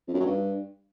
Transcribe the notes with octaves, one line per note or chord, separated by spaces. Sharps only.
F2
F#2
F#3
G2